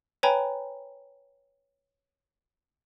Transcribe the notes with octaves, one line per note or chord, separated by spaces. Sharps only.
B4 C#5 G5 G#5 A#5 B5